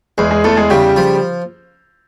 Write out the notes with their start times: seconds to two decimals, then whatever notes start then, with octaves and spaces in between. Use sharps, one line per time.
0.18 E2 G#3 G#4
0.31 G#3 G#4
0.44 E2 A3 A4
0.57 G#3 G#4
0.70 C#3 G3 G4
0.96 F3